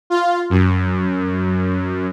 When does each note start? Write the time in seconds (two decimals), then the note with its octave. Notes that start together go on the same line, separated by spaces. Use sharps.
0.10 F4
0.50 F#2